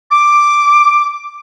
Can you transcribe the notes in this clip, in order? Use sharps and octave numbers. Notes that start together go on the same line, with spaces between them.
D6